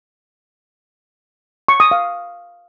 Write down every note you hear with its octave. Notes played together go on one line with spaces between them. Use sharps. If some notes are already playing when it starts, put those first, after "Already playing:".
C#6
D#6
F5